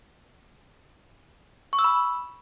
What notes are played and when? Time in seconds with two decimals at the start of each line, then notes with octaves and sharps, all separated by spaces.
1.73 C#6
1.79 E6
1.84 B5